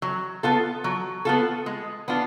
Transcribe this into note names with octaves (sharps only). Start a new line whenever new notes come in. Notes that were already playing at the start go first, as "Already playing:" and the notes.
F#3
B3 F4 A4
F#3
B3 F4 A4
G#3
B3 D4 F4